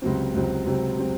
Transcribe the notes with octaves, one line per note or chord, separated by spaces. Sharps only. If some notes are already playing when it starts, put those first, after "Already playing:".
C#2 C3 F#3 C4
C#2 C3 F#3 C4
C#2 C3 F#3 C4
C3 F#3 C4